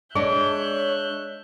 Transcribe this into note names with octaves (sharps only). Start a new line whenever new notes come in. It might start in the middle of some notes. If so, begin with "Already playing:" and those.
G#3 D4 G#4 C#5 E5 F#6 G6